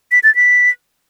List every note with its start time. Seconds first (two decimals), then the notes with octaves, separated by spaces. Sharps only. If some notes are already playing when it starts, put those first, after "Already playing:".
0.12 B6
0.24 A6
0.35 B6